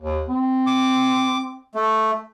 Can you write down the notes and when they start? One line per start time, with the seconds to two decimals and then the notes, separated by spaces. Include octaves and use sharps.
0.02 D#2
0.29 C4
0.67 D6
1.75 A3